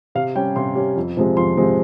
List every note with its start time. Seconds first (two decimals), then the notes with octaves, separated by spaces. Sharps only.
0.15 C3 F5
0.35 G3 C#4 G5
0.56 C3 C6
0.75 G3 C#4
0.96 F2
1.17 C3 F3 G#3 C4
1.37 F2 C6
1.57 C3 F3 G#3 C4